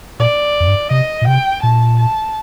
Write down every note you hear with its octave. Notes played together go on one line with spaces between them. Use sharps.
A#2 D5
F2
G2
C3 D#5
A#2
C3 G5
A#2 A5
A5